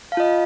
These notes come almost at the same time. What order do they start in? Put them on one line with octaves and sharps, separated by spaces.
F5 A5 F4 D#5